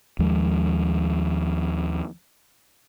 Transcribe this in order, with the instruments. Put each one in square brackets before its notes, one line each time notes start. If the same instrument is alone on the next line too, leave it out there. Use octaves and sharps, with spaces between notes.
[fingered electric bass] D#2 F3 G#3